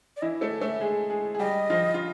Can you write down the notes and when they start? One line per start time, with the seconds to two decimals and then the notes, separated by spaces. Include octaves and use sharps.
0.17 D5
0.21 E3 E4 D#5
0.41 A3 A4 D#5
0.61 A3 A4 E5
0.81 G#3 G#4
1.10 G#3 G#4
1.35 G#4
1.39 G3 G4 D#5
1.70 F3 F4
1.94 F4